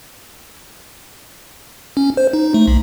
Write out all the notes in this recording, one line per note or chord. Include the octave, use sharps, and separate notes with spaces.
C#4
C5
D#4
A3
B1